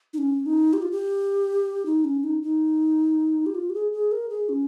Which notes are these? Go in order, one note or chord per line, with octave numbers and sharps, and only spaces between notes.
D#4
C#4
D#4
G4
F4
G4
D#4
C#4
D#4
D#4
G4
F4
G4
G#4
G#4
A#4
G#4
C#4